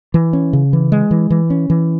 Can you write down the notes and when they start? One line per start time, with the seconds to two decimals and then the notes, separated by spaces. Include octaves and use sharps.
0.14 E3
0.33 C#4
0.53 C#3
0.73 E3
0.92 G#3
1.11 E3
1.30 E3
1.50 C#4
1.70 E3